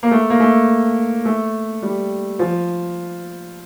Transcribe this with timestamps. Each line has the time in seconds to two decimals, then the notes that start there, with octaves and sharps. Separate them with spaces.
0.03 A#3
0.11 A3
0.30 A#3
0.40 A3
1.25 A3
1.82 G3
2.39 F3